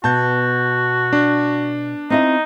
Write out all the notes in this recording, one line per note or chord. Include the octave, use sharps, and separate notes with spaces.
B2 F#4 A5 G6
D4
C4 D#4 E4 D#5